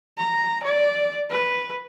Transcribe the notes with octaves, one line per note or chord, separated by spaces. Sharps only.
A#5
D5
B4